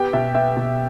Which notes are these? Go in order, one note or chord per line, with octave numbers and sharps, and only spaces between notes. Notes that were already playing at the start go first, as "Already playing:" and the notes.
Already playing: B3 G4 G5
B2 E5
B3 E5
B2